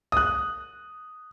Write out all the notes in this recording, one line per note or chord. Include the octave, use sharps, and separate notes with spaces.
D#6 F#6